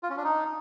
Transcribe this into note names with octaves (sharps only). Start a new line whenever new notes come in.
F4
C#4
D4
D#4